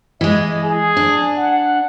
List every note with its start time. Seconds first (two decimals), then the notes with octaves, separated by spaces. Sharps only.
0.21 E3 G#3 D#5
0.63 G#4
0.97 D4
1.37 F#5